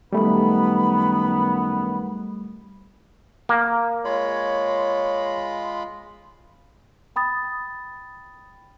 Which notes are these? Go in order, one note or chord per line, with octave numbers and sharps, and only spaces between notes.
F#2 D#3 G3 A3 B3 B5
A#3
G#3 F4 C#5 B5
G5 B5 D#6 A6